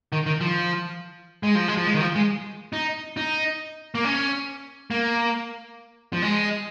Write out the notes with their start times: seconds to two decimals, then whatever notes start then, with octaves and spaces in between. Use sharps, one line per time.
0.13 D#3
0.26 D#3
0.41 F3
1.43 G#3
1.55 F3
1.68 G#3
1.77 F3
1.86 G#3
1.94 D#3
2.01 F3
2.16 G#3
2.73 D#4
3.17 D#4
3.95 A#3
4.04 C#4
4.91 A#3
6.13 F3
6.22 G#3